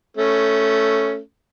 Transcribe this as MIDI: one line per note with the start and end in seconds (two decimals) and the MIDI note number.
0.17 1.20 57
0.17 1.20 61